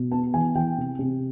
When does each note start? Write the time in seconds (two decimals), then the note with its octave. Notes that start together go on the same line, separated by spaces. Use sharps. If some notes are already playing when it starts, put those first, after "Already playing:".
Already playing: B2
0.11 B3 A5
0.34 E3 G#5
0.55 E3 G5
0.78 C3
0.99 C3